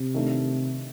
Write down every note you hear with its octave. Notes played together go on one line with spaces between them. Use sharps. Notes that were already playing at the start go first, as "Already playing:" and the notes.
Already playing: C3
D#3 A3 D4